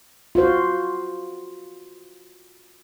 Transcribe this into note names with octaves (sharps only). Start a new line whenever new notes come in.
F4 F#4 C5